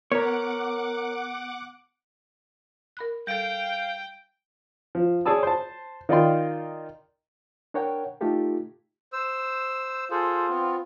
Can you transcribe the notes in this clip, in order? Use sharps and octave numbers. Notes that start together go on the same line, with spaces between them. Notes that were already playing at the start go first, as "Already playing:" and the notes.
B3 A#4 C#5 F#5 A#5 D6
A#4 B5 F#6
G3 A4 F5 G5 G6 D7
F3
G#4 C#5 D5 A5 D#6 E6
C5 A5
D#3 D#4 F4 D5 G5 C6
D4 A#4 C#5 F#5 G5
A3 D#4 F4 G4 A4
C5 E6
F4 G#4 A4 C5
B3 C4